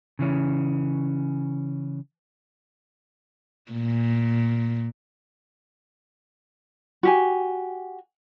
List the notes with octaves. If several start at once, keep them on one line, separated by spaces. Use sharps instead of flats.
C#3 E3 C#4
A#2
F#4 G4 G#5